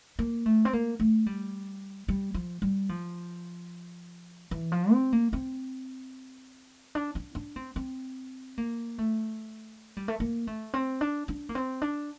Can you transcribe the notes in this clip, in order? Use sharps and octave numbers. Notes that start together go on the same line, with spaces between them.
A#3
A3
C4
A#3
A3
G3
G3
F3
G3
F3
E3
F3
C4
A#3
C4
D4
D4
D4
C4
C4
A#3
A3
G3
A3
A#3
A3
C4
D4
D4
A#3
C4
D4